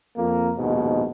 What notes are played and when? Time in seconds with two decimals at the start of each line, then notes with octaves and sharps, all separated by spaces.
0.16 F2 A#3
0.57 A#1 D#2 G#2 B2